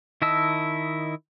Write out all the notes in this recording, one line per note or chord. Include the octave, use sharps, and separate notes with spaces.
D#3 E4 D#5 A5 E6